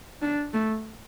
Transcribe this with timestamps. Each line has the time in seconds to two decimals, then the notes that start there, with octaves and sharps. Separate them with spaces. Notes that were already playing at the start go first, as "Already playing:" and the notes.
0.22 D4
0.54 A3